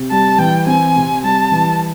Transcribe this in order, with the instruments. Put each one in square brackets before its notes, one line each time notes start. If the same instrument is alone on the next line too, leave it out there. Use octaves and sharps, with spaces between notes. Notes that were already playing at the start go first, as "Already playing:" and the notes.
Already playing: [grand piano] C3
[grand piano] G3 [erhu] A5
[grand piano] E3 [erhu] G5
[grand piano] C4 [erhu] G#5
[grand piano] C3
[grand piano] G3 [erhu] A5
[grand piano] E3